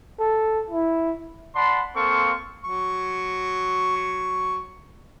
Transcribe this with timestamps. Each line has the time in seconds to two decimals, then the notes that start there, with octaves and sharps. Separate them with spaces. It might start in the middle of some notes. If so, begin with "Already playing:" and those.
0.20 A4
0.70 E4
1.56 D5 F#5 A5 B5 C6
1.96 A#3 C4 A4 F5 C6 C#6
2.65 F#3 C#6